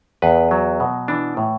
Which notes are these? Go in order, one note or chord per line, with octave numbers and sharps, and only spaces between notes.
E2 B4
F#3
B2
E3 D4
A2